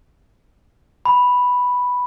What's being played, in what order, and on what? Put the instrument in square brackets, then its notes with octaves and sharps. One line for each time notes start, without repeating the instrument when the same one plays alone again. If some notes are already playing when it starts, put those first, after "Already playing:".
[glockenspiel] B5